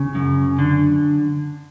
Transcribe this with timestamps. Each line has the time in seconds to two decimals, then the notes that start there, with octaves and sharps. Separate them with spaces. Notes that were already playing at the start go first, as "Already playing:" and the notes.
Already playing: C#3
0.15 F#2
0.59 D3